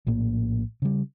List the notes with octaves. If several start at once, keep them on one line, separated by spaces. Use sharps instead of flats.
A#1 A2 A#3
C#3 G3